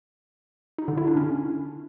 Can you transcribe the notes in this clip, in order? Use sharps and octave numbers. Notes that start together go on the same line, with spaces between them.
D#4
D3
E4
D4
C#4